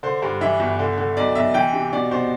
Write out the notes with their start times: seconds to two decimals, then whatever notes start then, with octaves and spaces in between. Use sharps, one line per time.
0.03 D3 C5
0.22 G2
0.41 E3 E5
0.60 G1
0.79 D3
0.98 D3
1.17 B1 D5
1.35 B1 E5
1.54 E3 G5
1.73 C3
1.93 B2 D5
2.11 B2 C5